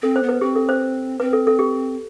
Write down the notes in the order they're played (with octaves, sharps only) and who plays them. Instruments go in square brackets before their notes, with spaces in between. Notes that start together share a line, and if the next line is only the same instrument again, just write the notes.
[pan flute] C4 [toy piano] A4
[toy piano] C5
[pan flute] B3
[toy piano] B4
[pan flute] C4 [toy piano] G4
[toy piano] A4
C5
[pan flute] C4 [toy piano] B4
[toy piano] A4
A4
G4